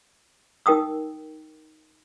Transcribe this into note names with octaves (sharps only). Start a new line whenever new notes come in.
D#4 A#4 G5 D#6 E6